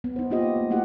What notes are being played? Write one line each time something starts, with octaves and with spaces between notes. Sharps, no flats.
B3
D#4 C5
A#3 D#4 F4 G4 C5 D#5
A3
A3 A#3 E4 F#4 G4 F#5